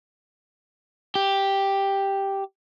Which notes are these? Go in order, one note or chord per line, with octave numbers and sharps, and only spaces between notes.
G4